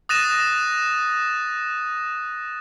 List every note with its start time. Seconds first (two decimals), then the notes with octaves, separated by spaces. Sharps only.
0.09 D#6 F#6 A6 A#6 D#7 E7